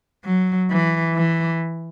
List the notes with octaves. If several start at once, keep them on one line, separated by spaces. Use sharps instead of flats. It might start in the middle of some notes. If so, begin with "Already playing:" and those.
F#3
E3
E3